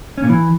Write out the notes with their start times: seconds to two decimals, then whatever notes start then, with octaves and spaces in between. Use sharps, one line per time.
0.18 C#4
0.23 A#2
0.29 E3